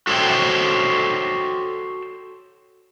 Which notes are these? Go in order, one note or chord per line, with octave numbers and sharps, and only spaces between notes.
F#4 A4 C5 C#5 G5